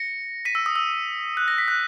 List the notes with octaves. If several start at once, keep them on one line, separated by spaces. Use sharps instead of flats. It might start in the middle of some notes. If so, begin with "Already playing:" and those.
Already playing: A#6 C#7
B6 D#7
E6
D#6
E6
F#6
A#6
B6
F#6